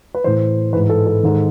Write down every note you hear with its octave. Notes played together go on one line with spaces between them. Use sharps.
B4
A2 E3 C5
G#2 E3 B4
A4
A4
G#2 D#3